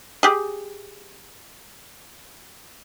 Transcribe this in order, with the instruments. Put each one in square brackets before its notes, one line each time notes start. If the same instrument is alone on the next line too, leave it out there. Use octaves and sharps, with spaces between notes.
[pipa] G4 G#4